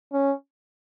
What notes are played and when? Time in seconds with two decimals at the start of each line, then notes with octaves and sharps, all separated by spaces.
0.13 C#4